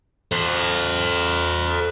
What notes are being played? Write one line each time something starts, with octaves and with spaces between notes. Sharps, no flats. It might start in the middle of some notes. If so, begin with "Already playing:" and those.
A4 C5